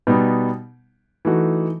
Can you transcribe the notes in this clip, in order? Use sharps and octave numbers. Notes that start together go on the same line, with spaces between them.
B2 G3 B3 D#4
E3 A3 D#4 F#4